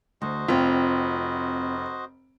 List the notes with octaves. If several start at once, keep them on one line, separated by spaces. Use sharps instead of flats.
D2 F#4 C5 D#5
F1 C4 F4